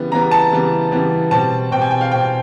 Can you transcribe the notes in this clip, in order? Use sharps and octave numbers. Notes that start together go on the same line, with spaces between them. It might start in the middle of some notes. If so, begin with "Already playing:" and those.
Already playing: C#3 E3 G3 B3
C#3 E3 G3 B3 A#5
A5
C#3 E3 G3 B3
C#3 E3 G3 B3
B2 G3 C4 A5
B2 G3 C4 G5
G#5
G5
F5
B2 G3 C4 G5